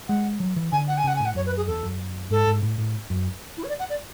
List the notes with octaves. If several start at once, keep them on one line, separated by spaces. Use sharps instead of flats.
G#3 F#5
F#3
E3
D3 G#5
F#5
G#5
C#3 F#5
A2 G#5
F#5
F#2 C#5
B4
G#4
E2 A4
F#2
G#2 A4
G#2
A2
A2
F#2
E4
C#5
D5
F#5
D5